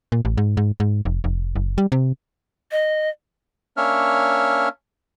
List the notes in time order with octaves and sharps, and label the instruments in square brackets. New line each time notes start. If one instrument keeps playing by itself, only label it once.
[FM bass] A#2
A1
G#2
G#2
G#2
F1
F1
F#1
G3
C3
[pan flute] D#5
[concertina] A#3 C#4 D4 C#5 E5 F6